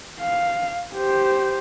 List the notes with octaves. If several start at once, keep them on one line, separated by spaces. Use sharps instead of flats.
F5
G4 C5